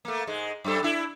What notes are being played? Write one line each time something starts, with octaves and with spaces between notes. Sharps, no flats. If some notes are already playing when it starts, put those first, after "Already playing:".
A3 A#3
G#2 G#3
F#2 G3 A4
D4 E4